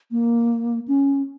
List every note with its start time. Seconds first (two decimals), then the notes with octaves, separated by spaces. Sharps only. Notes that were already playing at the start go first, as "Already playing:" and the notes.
0.11 A#3
0.88 C#4